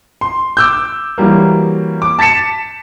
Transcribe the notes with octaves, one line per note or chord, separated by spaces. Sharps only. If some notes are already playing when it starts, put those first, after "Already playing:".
C6
D6 E6 G6
E3 F#3 G3 A#3
D6
A5 A6 B6 C#7 E7